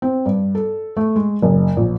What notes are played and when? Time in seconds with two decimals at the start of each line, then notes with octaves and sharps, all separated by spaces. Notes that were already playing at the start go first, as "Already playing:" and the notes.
0.02 C4
0.26 G2
0.55 A4
0.97 A3
1.16 G#3
1.42 F#1
1.77 A#1